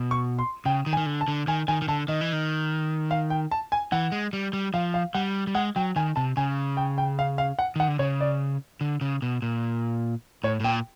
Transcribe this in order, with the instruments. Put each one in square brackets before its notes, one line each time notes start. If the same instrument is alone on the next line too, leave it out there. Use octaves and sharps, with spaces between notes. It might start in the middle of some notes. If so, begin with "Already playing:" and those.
Already playing: [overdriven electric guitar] B2
[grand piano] C#6
C6
[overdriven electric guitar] C#3 [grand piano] G5
[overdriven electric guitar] D#3
[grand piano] G#5
[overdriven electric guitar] D#3
D3
[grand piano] A5
[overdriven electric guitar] D3
[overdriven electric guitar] D#3 [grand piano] G#5
[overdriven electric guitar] D#3 [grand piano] G#5
[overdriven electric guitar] D#3
[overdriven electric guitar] D3 [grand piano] A5
[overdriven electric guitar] D#3 [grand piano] D#5
[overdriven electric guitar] E3
D#3
[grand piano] F5
G5
A5
G#5
[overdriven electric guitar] E3 [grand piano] F#5
[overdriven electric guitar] G#3
G3
G3
[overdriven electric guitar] F3 [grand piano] F5
[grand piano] F5
[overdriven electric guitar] G3 [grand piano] F#5
[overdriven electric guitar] G3
[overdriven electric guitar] G#3 [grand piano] F#5
[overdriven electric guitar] F#3 [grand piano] G5
[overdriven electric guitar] D#3 [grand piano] G#5
[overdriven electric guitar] C3 [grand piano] A5
[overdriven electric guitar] C#3 [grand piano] G#5
[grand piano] G5
G5
F5
F5
F#5
[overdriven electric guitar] D#3 [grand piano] F#5
[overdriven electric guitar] D3
[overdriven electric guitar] C#3 [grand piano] C#5
[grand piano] D5
[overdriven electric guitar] D3
C#3
B2
A#2
[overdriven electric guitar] A2 [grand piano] C#5
[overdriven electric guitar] A2
[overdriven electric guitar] A#2 [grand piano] G5